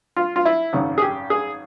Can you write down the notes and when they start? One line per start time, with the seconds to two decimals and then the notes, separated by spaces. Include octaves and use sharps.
0.16 F4
0.36 F4
0.45 E4
0.73 G#1 F#2 C#3
0.98 G#4
1.02 G4
1.30 G#4